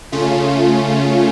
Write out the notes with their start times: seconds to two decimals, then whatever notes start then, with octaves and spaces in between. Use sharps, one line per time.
0.12 C#3 A3 C#4 F4